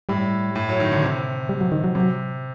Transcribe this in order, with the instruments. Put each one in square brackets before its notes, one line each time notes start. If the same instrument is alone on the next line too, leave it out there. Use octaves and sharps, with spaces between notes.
[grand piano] A2 [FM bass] G3
[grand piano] A2
F#3
D#3
D3
C3
[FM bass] G3
F#3
D#3
F#3
[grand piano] C3 [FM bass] F#3